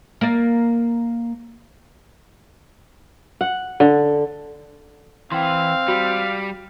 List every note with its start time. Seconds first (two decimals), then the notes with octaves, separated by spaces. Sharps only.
0.21 A#3 D5
3.41 F#5
3.80 D3
5.32 E3 C4 F5 G5 C6
5.88 G3 F#4